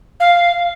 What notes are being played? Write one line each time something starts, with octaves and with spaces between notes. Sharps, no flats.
F5